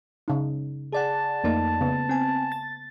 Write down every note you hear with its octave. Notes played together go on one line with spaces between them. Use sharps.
C#3 D#4
G#4 D5 F#5 A5
F2 A3 A#3 D#4 D5
C#3 B3
C4 G#5
A6